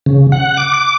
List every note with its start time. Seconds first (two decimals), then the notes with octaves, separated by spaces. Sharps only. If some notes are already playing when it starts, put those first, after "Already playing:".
0.06 C#3
0.32 F#5
0.57 D6
0.74 D6